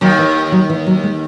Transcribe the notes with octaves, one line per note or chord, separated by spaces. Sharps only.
D#2 D#3 F#3
E3
F#3
E3
F#3
G#3